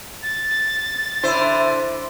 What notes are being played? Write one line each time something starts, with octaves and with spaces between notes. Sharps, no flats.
A6
D3 E4 C5